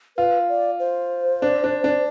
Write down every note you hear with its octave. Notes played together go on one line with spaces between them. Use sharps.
F4 B4
D5
C5
D4
D4
D4